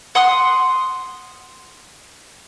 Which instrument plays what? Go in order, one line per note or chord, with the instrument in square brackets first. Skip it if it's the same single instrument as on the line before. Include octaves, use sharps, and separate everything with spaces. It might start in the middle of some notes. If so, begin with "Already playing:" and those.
[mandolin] F#5 C6 D#6